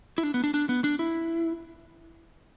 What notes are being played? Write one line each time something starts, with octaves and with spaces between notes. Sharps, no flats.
E4
D4
B3
D4
D4
B3
D4
E4